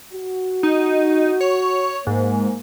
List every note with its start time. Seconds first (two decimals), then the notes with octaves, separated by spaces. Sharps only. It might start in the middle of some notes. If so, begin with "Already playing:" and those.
0.13 F#4
0.63 D#4
1.41 C#5
2.07 G#2 A#3